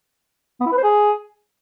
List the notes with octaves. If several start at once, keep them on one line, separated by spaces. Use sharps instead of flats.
B3
E4
B4
C5
G#4